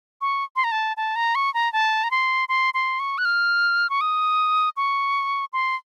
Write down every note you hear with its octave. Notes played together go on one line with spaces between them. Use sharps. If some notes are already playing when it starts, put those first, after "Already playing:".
C#6
C6
A#5
A5
A5
A#5
C#6
A#5
A5
A#5
C6
C6
C6
C#6
F#6
F6
C#6
D#6
C#6
C6